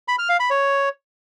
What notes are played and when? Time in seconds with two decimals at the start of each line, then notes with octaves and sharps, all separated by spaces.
0.08 B5
0.19 F6
0.29 F5
0.40 B5
0.50 C#5